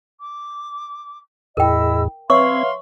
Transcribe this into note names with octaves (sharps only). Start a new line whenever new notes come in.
D6
E2 A2 E4 G#4 A#4 D#5 G5 E6
C4 B4 C#5 E5 F5 C6 C#6 G#6